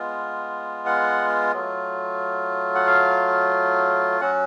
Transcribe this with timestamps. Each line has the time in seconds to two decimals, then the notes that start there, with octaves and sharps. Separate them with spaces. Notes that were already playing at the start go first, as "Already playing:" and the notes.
Already playing: G#3 B3 F4
0.86 F#5
1.53 F#3 A3 F4
2.75 F#5
2.87 F5
4.21 F#3 C#4 F#4 F#5